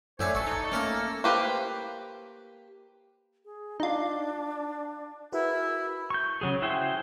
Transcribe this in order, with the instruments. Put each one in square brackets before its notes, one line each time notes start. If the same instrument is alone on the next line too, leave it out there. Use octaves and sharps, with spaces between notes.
[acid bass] F#2 [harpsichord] A2 D4 E5 [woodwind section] C5 C#5 G#5
[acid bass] A1 [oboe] A4 [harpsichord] E5 [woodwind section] C#6
[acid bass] D#4
[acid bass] A3 [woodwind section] A#3 [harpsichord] C#4 A#4
[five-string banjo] A#3 G4 B4 C5 F5
[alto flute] G#4
[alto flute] D4 [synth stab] D#4 F4
[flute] E4 [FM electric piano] F#4 G#4 B4 [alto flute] A#4
[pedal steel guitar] C#6 G6
C#3 F#3 G#4
E4 F#4 G#4 C5 G5